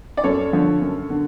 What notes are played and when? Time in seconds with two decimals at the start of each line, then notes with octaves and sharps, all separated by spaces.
0.17 D5
0.24 F#2 A4 C#5
0.53 D3 F3
0.81 F#2
1.10 D3